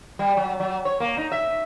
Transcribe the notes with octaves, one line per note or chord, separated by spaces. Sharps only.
G3
F#3
F#3
C#5
A#3
D#4
E5